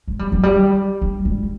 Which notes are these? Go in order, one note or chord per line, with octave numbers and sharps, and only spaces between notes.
G#3
G3
F#3
G3
G3
G#3